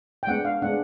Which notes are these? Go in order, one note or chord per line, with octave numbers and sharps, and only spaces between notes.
G5
G#3 B3 D4 F#5
F5
G#3 B3 D4 F#5